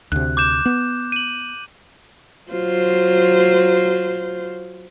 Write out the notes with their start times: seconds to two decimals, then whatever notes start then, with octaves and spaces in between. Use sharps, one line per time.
0.12 D2 C3 F#6
0.37 D6 G6 E7
0.66 B3
1.12 D#7 F#7
2.51 F#3 F4 C5